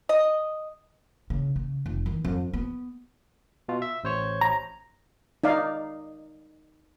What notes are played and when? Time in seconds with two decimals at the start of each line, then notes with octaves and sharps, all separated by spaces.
0.09 D#5
1.30 C#3
1.56 C#3
1.86 F1
2.06 D#3 E3
2.25 F2
2.54 B3
3.69 B2 F4
3.82 E5
4.04 A1 C5 C#5
4.41 A#5
5.44 D#4 D5 F5